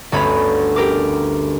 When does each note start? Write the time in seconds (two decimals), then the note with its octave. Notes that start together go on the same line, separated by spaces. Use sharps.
0.12 G1 D2 C#4 B5
0.76 G4 A#4 D6